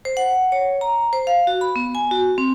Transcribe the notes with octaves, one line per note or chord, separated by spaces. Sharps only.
C5
F#5
C#5
A#5
C5
F5
F#4
B5
B3
G#5
F#4
C4